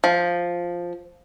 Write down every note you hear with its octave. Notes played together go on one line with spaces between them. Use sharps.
F3